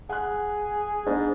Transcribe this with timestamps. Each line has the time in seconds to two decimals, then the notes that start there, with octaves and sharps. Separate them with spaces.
0.09 G#4 F#5 F#6
1.06 G#2 B3 D4